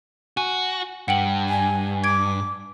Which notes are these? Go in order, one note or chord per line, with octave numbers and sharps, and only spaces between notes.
F#4 G#5
G2 F#5 G5 F#7
G#5
D6 G#6 D7